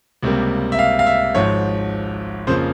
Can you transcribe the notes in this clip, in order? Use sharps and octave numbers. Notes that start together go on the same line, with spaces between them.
C#2 C3 G3 A#3
E5
F5
F5
E5
G#1 G#2 F3 C#5
F2 C#3 F3 A#3 C5